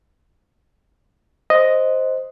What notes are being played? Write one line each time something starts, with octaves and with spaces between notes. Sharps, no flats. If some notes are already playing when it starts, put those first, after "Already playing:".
C5 D#5